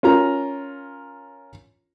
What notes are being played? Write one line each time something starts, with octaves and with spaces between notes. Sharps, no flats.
C#4 F4 A#4 A#5